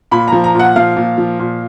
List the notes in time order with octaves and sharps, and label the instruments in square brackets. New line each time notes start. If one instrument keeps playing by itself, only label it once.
[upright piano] A#2 B5
F3 A#5
A#5
A#2 F#5
F3 F5
A#2
F3
A#2